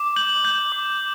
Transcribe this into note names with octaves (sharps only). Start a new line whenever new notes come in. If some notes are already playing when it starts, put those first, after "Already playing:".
Already playing: D6
G6 F#7
G6
D6